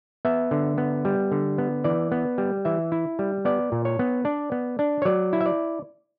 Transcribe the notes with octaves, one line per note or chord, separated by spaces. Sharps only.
B3 E5
D3
B3
G3
D3
B3
E3 D5
B3
G3
E3 E5
E4
G3
B3 D5
A#2
C#5
B3
D4 D5
B3
D4
C#5
F#3 D5
E4
E5
D5